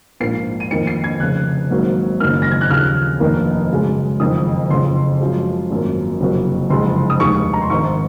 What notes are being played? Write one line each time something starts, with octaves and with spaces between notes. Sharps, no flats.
A#1 G#2 F3 A#3 C7
D#7
F2 D#3 A#3 C#7
C7
G#6
F1 F2 C#3 F#6
G#1 G#2 F#3 A#3
F#1 F#2 D#3 F#3 A#3 F6
A#6
G#6
F#6
D#2 C#3 F3 F6
F1 F2 D#3 A#3
F#2 C#3 G#3
F#1 F2 D#3 D#6
F#1 F2 C#3 C6
F#2 F3 G#3
G#1 F#2 F3 A#3
F#1 F2 C3 F#3 A#3
F#1 F2 C3 F3 G#3 C6
D#6
F1 D#2 D#3 G#3 C#6
A#5
C6
G#1 G#2 D#3 C#6